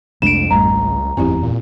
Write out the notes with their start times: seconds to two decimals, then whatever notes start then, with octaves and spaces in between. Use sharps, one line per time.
0.22 C2 F2 G#3 A3 D4 D7 E7
0.51 G#1 G3 A3 A#5
0.73 C#2
1.17 F#1 E2 G#2 C4 E4 G4
1.43 A#2